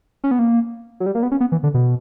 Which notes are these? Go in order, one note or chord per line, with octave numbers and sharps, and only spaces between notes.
C#4
B3
A#3
F#3
G3
A#3
B3
C#4
B3
E3
D3
B2